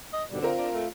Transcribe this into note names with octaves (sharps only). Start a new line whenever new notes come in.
D#5
G#2 B2 D3 G3
C4 F4 A#4
D4
A3